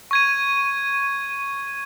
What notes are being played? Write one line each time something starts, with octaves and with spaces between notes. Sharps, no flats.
C#6 G#6 D#7